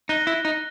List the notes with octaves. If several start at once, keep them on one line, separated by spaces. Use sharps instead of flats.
D#4 F#6 A#6 D#7 G7
E4
D#4